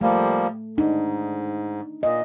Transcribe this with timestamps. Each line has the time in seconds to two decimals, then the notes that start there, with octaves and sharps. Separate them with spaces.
0.01 F3 G3 A3 A#3
0.78 G#2 D4 D#4
2.03 A#2 D#5